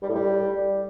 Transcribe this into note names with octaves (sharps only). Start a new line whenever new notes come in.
G3
A2
G3